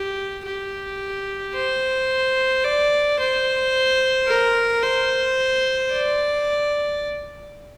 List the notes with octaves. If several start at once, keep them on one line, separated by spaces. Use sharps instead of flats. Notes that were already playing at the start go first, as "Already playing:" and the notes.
Already playing: G4
G4
C5
D5
C5
A#4
C5
D5